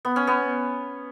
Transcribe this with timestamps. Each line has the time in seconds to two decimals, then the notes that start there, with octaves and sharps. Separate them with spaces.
0.05 B3
0.16 C#4
0.27 B3